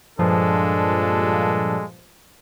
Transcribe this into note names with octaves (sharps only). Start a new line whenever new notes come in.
G2 A#2 F3 G#3 D4 A4